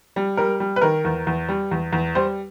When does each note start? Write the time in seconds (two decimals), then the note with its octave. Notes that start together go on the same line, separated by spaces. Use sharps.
0.16 G3
0.37 G3 A#4
0.60 G3
0.76 B4
0.81 D#3 A#4
1.05 E2
1.27 E2
1.49 G3
1.71 E2
1.92 E2
2.15 G3 C5